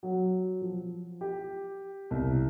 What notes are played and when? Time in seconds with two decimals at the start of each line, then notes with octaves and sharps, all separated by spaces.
0.03 F#3
0.62 F3
1.21 G4
2.11 C2